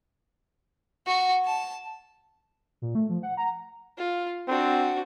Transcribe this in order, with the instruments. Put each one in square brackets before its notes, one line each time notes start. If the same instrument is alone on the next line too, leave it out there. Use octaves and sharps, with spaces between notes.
[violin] F#4
A5
[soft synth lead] A#2
A3
F3
F#5
A#5
[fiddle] F4
[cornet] C4 [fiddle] D4 F#4